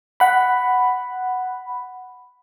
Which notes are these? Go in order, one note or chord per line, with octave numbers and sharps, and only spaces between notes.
F#5 B5